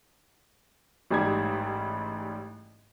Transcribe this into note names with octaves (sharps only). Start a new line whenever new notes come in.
A1 G#2 G3 G4 G#6